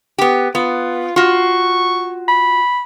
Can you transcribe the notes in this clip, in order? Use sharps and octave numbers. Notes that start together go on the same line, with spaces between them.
B3 G4
B3 F4
F4 F#4 C#6
B5